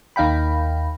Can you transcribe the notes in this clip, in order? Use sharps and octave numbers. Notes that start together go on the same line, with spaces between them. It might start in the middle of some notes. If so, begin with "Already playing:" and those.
D#2 D#4 F5 G5 B5